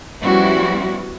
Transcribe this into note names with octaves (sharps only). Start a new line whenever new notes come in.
F3 G3 B3 C#4 E4 F#4